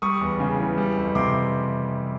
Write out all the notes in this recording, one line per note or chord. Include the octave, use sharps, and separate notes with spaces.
G3 C#6 D#6
E2
C#3
E3
G3
F2
C3 C6 D6